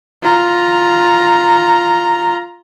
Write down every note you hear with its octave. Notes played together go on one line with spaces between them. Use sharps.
F4 A#5